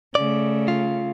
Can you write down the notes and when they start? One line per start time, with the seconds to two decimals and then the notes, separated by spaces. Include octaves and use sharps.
0.15 C#3 A3 D5
0.68 F4